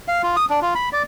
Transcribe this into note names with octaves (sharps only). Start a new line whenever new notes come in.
F5
F4
D#6
D4
F4
B5
D5